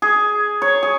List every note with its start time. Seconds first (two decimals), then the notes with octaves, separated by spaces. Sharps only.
0.02 G#4
0.62 C#5
0.83 G#4